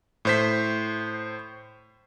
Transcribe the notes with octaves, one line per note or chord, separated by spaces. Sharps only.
A2 C5 B6